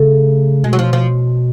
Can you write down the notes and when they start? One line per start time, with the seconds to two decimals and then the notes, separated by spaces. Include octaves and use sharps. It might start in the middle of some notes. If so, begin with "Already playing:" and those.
Already playing: C#3 A3
0.64 B2 G#3
0.73 F#3
0.79 F3
0.93 F3